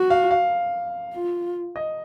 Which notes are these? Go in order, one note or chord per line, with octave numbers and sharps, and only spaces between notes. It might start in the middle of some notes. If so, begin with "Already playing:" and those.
Already playing: F#4
F5
F5
F4
D#5